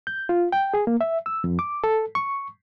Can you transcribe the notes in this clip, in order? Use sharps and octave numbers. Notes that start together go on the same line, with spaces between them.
G6
F4
G5
G#4
A#3
E5
E6
F2
D6
A4
C#6